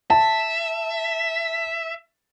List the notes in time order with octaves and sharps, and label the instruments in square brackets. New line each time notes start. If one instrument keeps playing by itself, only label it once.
[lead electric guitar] E5 [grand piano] A5